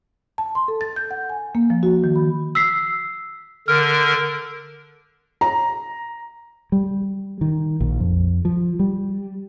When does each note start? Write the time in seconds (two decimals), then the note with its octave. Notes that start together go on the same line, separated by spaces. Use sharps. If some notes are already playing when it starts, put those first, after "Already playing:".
0.38 A5
0.55 C6
0.68 A4
0.81 A6
0.96 G6
1.11 F#5
1.29 G#5
1.55 A#3
1.70 F3
1.83 F#4
2.04 D#3
2.16 B5
2.55 E6 B6 C7
3.68 D3 A#4 F6
5.41 A#5
6.72 G3
7.41 D#3
7.80 A#1
8.00 F2
8.45 F3
8.80 G3